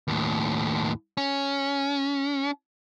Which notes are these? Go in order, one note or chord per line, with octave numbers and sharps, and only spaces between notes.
D#2 A2
C#4